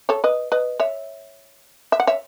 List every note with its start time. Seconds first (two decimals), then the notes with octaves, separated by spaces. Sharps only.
0.09 A4 C#5
0.24 B4 D#5
0.52 B4 D#5
0.80 C#5 E5
1.92 E5
2.00 F#5
2.07 C#5 E5